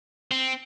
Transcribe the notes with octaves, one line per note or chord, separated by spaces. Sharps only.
C4